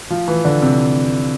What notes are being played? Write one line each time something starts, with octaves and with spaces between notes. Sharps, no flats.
F3
E3
D3
C3